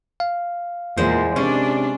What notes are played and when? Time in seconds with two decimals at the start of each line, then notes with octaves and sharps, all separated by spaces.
0.20 F5
0.97 E2 A#2 G#3 C5
1.36 C3 C#4 D4